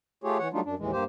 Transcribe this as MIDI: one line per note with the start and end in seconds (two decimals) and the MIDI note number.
0.24 0.38 57
0.24 0.38 65
0.24 0.38 67
0.24 0.38 68
0.24 0.38 73
0.39 0.48 52
0.39 0.48 73
0.39 0.48 78
0.53 0.60 54
0.53 0.60 55
0.53 0.60 57
0.53 0.60 62
0.53 0.60 63
0.53 0.60 65
0.65 0.75 42
0.65 0.75 62
0.79 0.91 39
0.79 0.91 45
0.79 0.91 52
0.79 0.91 56
0.92 1.04 43
0.92 1.04 58
0.92 1.04 67
0.92 1.04 72